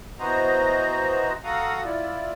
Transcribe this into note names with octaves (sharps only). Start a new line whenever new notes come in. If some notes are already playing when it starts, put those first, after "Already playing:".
E3 B3 F#4 C5 D#5 A#5
F#4 A4 F5 F#5 A#5 D#6
E4 F4 D5